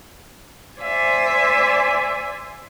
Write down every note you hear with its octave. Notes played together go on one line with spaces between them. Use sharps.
C5 D5 E5 G#5